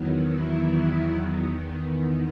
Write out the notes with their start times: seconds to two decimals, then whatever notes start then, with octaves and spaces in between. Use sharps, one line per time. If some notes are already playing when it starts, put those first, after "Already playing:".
Already playing: E2 D#3 F#3 B3
0.28 E3 E4